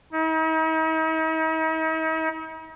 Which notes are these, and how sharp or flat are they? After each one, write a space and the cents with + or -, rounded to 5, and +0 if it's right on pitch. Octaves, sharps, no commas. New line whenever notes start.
D#4 +45